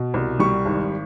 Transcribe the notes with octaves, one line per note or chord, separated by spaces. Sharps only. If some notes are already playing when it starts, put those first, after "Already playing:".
Already playing: B2
C2
G3 C#6
G#1